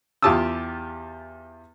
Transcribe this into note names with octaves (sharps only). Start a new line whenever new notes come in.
E2 F4 G4 A5 D#6 E6